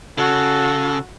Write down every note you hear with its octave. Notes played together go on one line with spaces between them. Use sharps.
C#3 F#4 A4